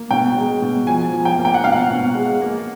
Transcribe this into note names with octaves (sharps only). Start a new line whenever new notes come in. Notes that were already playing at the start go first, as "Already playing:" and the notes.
Already playing: A#3
B2 G5
G#3
B2
F3 G#5
F3
G5
A#3
G5
F#5
B2 F5
F#5
B2
G#3
A#3